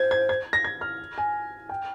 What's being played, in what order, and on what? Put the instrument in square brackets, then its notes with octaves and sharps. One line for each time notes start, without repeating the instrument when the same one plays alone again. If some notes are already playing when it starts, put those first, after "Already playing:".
Already playing: [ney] C5 [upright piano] G#6
[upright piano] G#6
G#6
A#6
G#6
F6
G#5
G5